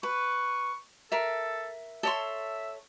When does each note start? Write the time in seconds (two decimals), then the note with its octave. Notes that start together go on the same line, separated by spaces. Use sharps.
0.03 B4 C#6
1.12 A4 A#4 E5
2.03 A4 C#5 E5 C6